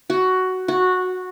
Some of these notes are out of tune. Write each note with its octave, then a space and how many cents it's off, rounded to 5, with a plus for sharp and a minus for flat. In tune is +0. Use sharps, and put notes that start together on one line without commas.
F#4 +10
F#4 -10